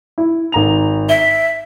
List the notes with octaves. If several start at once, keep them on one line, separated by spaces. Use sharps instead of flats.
E4
G#1 A#5 F7
E5 G7